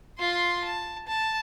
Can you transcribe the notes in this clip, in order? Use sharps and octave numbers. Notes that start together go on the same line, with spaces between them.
F4 C6
A5
A5